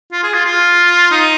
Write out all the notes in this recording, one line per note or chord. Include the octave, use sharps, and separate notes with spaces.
F4
G#4
F4
F4
D#4